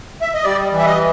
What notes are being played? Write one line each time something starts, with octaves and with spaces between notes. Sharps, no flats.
E5
D#5
G3 D5
E3
E5
D#5